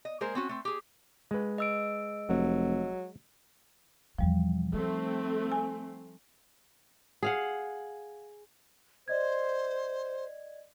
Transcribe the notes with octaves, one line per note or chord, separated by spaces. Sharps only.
D#5
G#3 A#3 G#4 A#4 C5
C4 C#4 F#4
A3 C4
G4 G#4
G#3 B4
D#5 E6 D7
F1 F#3
E2 B2 F3 G3
A3 C4 D#4
G#5
G#4 F5 F#5
C5 D5 D#5 G#6